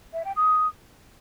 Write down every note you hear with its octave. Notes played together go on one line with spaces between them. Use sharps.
E5
G5
D#6